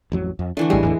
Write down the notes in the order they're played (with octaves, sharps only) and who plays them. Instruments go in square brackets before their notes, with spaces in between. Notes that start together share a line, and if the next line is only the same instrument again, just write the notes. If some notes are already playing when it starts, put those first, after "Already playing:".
[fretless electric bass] A1 F2 F#3
F2
[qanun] D3 E3 A3 [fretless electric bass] D4
[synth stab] A1 G3 [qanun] G#3
[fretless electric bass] D1 A2 D3 [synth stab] E2